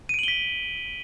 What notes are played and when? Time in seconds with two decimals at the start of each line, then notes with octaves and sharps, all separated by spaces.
0.09 D#7
0.14 D7
0.19 F#7
0.23 G7
0.28 B6